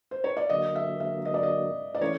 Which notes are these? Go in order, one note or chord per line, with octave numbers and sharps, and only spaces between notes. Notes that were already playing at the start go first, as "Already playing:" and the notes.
C5
C#5
D5
D3 F#3 A#3 D#5
E5
E5
D#5
D5
D#5
D5
E3 A3 C#4 C#5